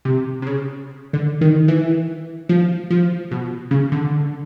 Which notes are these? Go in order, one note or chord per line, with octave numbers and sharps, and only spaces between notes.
C3
C3
C#3
D3
D#3
E3
F3
F3
B2
C#3
D3